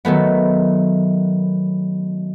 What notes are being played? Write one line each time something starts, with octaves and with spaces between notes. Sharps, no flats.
D#3 F#3 A3 B3